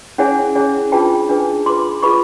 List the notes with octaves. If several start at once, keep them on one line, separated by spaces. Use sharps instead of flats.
C#4 E4 G#4 C#5 F#5 G#5
C#4 E4 G#4 C#5
D4 F4 G#4 B4 G5 A5
D4 F4 G#4 B4
F4 G#4 B4 C6 D6
F4 G#4 B4 B5 C#6